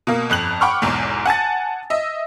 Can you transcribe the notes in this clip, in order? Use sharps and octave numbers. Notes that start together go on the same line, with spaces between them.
B2 A#3
G1 F2 F#6 F#7
F#5 G5 B5 C#6 D6 F6
B1 E2 G#2
F#5 G#5 A5 A6
D#5 E5